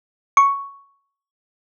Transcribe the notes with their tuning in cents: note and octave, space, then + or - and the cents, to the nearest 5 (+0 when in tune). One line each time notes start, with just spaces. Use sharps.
C#6 +5